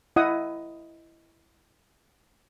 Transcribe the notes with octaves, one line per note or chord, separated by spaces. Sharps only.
E4 D#5 F#5 D#6